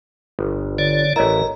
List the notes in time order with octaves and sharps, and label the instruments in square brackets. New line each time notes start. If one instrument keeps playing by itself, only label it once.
[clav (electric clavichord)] G1
[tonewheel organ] D3 C#5 D5
[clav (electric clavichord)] A1 E4 [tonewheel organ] A#4 [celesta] C#5 D#5 A#5